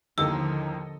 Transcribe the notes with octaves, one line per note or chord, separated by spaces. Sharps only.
D#2 A2 D3 F3 A#3 A4 D#5 E6